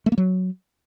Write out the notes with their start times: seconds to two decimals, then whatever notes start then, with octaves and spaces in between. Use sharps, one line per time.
0.06 A3
0.12 A#3
0.18 F#3